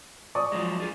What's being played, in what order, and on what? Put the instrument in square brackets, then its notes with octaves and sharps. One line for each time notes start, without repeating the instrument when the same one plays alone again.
[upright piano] D5 C#6 D#6
[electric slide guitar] F3 F#3 G#3
F4 G#4